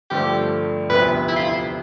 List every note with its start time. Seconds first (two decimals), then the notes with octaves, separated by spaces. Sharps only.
0.10 G2 D3 F3 A3 C4 G4
0.89 E1 D2 C3 F3 B3 B4
1.28 E4
1.36 F4
1.45 E4